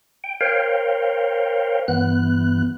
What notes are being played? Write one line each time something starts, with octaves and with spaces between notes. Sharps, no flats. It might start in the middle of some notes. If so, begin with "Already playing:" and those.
G5
A#4 C5 C#5 F5 G5
G2 E3 B3 F#6